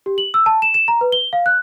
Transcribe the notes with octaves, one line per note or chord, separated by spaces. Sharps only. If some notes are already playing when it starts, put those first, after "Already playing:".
G4
F#7
E6
A5
E7
E7
A#5
B4
G7
F5
F#6